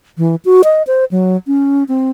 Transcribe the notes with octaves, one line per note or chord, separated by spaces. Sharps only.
E3
F#4
D#5
C5
F#3
C#4
C4